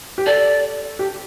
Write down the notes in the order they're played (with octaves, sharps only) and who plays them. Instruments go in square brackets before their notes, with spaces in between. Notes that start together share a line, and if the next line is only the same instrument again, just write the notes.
[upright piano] G4
[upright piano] A4 [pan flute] D5
[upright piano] G4